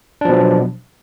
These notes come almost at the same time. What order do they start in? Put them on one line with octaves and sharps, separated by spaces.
D4 F3 B2 F#3